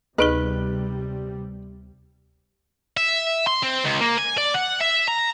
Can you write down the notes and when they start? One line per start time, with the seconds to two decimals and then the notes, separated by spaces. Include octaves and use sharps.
0.18 D2 C3 G3 D#4 G#4 B4
2.97 E5
3.47 C6
3.63 C4
3.84 C#2
4.01 A#3
4.18 G#5
4.38 D5
4.55 F#5
4.81 E5
5.08 A#5